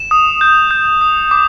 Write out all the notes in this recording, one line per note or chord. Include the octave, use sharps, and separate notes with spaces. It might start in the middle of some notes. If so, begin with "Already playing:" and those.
Already playing: E7
D#6
G6
G6
D#6
D6